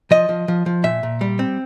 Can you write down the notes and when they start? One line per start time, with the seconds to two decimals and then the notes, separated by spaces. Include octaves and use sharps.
0.11 F3 D#5
0.29 F3
0.48 F3
0.66 F3
0.84 A#2 E5
1.03 A#2
1.21 G3
1.39 C4